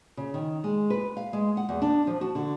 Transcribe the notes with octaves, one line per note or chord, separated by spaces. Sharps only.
C#3
D#3
G#3
B4
F5
G#3
F#5
E2
D4
F3
F#4
D3